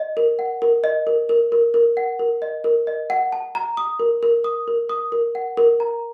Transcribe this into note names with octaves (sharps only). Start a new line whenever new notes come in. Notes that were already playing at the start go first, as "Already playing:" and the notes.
Already playing: D#5
A#4
F#5
A#4
D#5
A#4
A#4
A#4
A#4
F#5
A#4
D#5
A#4
D#5
F#5
A5
A#5
D#6
A#4
A#4
D#6
A#4
D#6
A#4
F#5
A#4
A#5